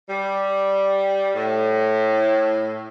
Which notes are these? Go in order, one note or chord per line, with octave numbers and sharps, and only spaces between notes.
G3
A2